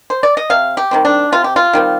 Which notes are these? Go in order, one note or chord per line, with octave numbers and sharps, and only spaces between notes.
C5
D5
D#5
C3 F5
G4
D#3 G3 C4
D4
C3 F4
G4
F4
D#3 G3 C4